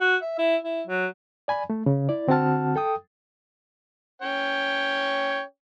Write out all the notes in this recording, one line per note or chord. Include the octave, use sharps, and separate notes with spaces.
F#4
E5
E4
E4
F#3
D5 G#5 B5
A3
C#3
E4 D5
D3 C4 F#4 F#5 A5 F6
A4 G5 D#6
C#4 C#5 G5